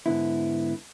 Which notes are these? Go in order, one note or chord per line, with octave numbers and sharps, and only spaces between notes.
G#2 D3 B3 E4